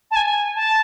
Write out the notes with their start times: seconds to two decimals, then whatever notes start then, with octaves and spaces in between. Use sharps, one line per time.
0.11 A5
0.16 G#5
0.55 A5